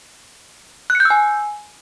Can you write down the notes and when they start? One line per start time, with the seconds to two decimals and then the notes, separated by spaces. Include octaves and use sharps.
0.90 F#6
0.95 C#7
1.00 G6
1.05 E6
1.10 G#5